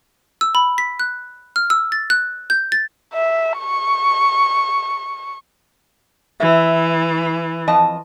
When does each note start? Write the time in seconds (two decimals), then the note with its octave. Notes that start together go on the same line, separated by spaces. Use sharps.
0.41 E6
0.55 B5
0.78 B6
1.00 F#6
1.56 F6
1.70 E6
1.92 A6
2.10 F#6
2.50 G6
2.72 A6
3.14 E5
3.59 C#6
6.40 E3 E5
7.68 F2 D#5 A5